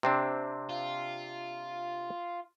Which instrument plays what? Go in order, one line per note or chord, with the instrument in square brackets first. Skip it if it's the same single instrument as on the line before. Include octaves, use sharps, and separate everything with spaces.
[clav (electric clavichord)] C3 C4 D4
[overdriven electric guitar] F4